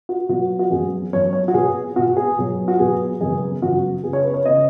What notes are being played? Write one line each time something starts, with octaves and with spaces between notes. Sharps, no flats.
F#4
B2 F#3 B3 F#4
F#4
F#2 F#3 B3 G#4
F#2 F#3 B3 C#5
C#5
F#4
B2 B3 G#4
B2 B3 F#4
G#4
B2 F#3 B3
F#4
B2 F#3 B3 G#4
F#2 C#3 B3 G#4
F#2 C#3 B3 F#4
C#3 B3 G#4
C#5
B4
C#5
C#3 B3 D#5